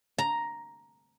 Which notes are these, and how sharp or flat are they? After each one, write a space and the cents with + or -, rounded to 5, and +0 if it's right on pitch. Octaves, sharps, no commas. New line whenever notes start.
A#5 +5